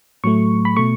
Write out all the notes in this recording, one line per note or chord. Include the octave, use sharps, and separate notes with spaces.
A2 F#3 A3 C#6
B5
B2 A3 C#6